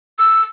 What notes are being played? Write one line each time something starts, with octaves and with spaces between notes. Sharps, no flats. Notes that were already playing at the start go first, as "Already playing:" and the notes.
E6